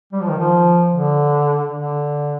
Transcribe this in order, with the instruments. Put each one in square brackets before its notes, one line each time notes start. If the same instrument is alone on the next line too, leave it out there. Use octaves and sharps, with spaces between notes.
[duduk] G3
F3
D#3
F3
D3
D3